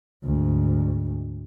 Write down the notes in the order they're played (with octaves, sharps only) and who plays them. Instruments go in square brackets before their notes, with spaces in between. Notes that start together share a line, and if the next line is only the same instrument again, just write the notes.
[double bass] D2 G#2